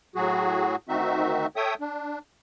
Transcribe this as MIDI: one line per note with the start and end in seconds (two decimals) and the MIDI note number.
0.15 0.76 45
0.15 0.76 54
0.15 0.76 66
0.15 0.76 68
0.89 1.46 38
0.89 1.46 51
0.89 1.46 60
0.89 1.46 63
0.89 1.46 66
0.89 1.46 76
1.56 1.74 69
1.56 1.74 73
1.56 1.74 76
1.56 1.74 79
1.56 1.74 87
1.80 2.19 62